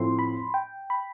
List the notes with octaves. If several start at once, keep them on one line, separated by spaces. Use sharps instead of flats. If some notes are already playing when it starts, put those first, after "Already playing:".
Already playing: A2 F3 C4 E4 C6
B5
G5
B5